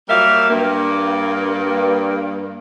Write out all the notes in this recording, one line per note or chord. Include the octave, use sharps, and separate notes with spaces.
F#3 G3 A#3 A#4 E5 F5
G2 A#3